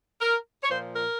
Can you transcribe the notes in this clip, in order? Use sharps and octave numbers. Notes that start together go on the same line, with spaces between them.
A#4
C#5
A#2 F3 C5
A#4